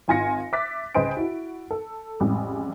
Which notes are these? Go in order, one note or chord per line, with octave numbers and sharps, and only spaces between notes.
G#1 F4 G#5 C6 A#6 C#7
E5 D6 F#6 A6 B6
C#2 B4 C5 D#5 G#5 D7
E4 F#4
A4
A1 F2 G3 G#3